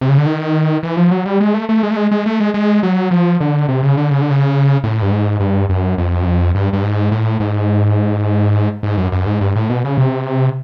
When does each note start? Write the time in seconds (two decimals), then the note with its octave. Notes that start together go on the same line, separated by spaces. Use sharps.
0.01 C3
0.09 C#3
0.18 D3
0.26 D#3
0.83 E3
0.97 F3
1.11 F#3
1.26 G3
1.40 G#3
1.54 A3
1.69 A3
1.83 G#3
1.91 A3
1.97 G#3
2.11 G#3
2.26 A3
2.40 G#3
2.54 G#3
2.83 F#3
3.11 F3
3.40 D3
3.68 C3
3.83 C#3
3.97 D3
4.11 C#3
4.21 D3
4.31 C#3
4.84 A2
5.02 G2
5.12 G#2
5.40 G2
5.69 F#2
5.98 F2
6.22 F#2
6.26 F2
6.55 G2
6.73 G2
6.83 G#2
7.11 A2
7.40 G#2
8.83 G#2
8.97 F#2
9.12 F#2
9.26 G#2
9.41 G2
9.56 A2
9.70 B2
9.84 C#3
9.98 C3